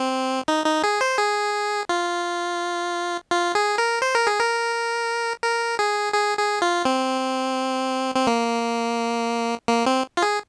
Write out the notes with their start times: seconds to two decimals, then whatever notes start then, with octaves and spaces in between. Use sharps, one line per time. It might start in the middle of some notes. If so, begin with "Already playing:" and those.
Already playing: C4
0.48 D#4
0.66 D#4
0.84 G#4
1.01 C5
1.18 G#4
1.89 F4
3.31 F4
3.55 G#4
3.78 A#4
4.02 C5
4.15 A#4
4.27 G#4
4.40 A#4
5.44 A#4
5.79 G#4
6.14 G#4
6.38 G#4
6.62 F4
6.85 C4
8.15 C4
8.27 A#3
9.68 A#3
9.86 C4
10.17 F4
10.22 G#4